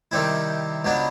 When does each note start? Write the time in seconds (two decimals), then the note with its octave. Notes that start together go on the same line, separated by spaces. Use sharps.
0.11 C3 D#3 G3 C4 E4
0.85 C#2 B2 F#3 B3 D4